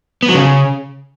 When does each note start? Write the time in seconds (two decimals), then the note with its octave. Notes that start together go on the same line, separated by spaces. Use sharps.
0.23 B3
0.29 F#3
0.35 C#3